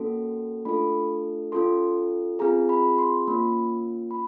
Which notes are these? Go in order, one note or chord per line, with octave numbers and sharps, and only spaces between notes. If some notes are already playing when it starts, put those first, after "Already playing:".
Already playing: A#3 C#4 F#4 A4
A3 D4 F4 A4 B5
C#4 F4 A4 C6
C4 F4 G#4 A#5
B5
C6
A#3 C#4 F4 B5
B5